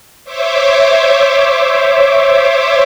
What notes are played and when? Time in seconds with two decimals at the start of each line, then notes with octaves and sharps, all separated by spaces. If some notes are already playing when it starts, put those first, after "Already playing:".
0.24 C5 C#5 E5 D6